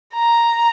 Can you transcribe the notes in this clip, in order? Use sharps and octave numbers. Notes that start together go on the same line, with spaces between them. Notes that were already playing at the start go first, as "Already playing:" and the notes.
A#5